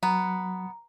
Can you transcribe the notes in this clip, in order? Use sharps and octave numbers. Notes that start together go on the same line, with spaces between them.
F#3 B3 A#5